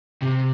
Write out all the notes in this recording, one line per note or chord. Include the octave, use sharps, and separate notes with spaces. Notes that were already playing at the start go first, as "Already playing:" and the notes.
C3